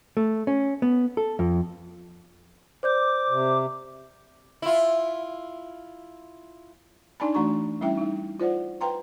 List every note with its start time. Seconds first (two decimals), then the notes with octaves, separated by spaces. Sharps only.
0.17 A3
0.47 C#4
0.82 B3
1.17 A4
1.39 F2
2.83 C5 D5 D6 G6
3.30 C3
4.62 E4 F4
7.20 D4 D#4 D5 G#5 A5 B5
7.34 E3 A3 D4 F#4 A#5 C#6
7.81 G3 C#4 E4 E5 G5
7.97 G3 D#4
8.40 F4 C5 D5 F#5
8.81 B4 F5 G5 A#5 C6